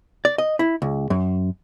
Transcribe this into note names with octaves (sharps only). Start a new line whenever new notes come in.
D5
D#5
E4
C#2
F#2